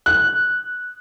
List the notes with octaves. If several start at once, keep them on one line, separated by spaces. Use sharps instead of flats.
F#6